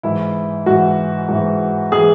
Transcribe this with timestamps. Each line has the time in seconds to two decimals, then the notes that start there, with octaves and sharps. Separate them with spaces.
0.03 G#2 E3 E4
0.66 G#2 E3 F#4
1.29 G#2 E3
1.92 E3 G#4